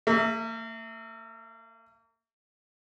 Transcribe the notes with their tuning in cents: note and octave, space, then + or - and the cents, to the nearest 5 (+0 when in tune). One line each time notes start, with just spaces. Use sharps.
A#3 -40 E5 +0